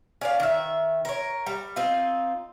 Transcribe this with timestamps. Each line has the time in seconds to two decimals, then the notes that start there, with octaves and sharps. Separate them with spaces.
0.21 C#4 D5 F5
0.40 D#3 E5
1.05 A#4 C#5
1.46 G3
1.76 C4 D#4 F4